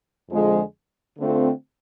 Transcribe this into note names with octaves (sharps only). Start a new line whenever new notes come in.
F2 D3 F3 G#3
D3 A3 C4 F4